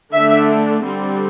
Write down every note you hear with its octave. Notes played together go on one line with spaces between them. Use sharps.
D3 A3 D4 E5
D3 G3 C4